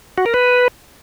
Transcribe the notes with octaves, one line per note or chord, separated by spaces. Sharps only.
F#4
A#4
B4